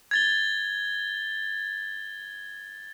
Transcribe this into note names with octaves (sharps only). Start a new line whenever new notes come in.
G#6 A6 G7